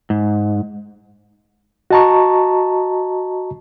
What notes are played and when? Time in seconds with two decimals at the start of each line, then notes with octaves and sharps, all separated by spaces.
0.10 G#2
1.91 F#4 D#5 A5 A#5 C#6